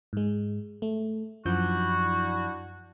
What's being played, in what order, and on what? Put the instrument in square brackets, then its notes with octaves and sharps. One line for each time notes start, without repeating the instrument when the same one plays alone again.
[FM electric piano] G#2 G#3
A3
[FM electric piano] F#2 F3 G6 [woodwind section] D4 E4 F#4